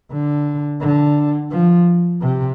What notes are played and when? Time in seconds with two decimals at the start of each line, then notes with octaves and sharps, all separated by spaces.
0.12 D3
0.81 D3
1.51 F3
2.22 C3